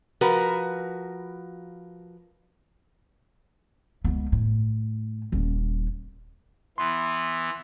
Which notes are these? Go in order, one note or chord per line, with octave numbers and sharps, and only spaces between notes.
F3 F#4 A#4 B4
C#2 B3
A2
D#1 C#4
E3 B3 C6